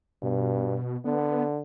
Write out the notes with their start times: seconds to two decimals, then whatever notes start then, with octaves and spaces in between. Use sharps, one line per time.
0.22 G2 B2
1.05 D3 B3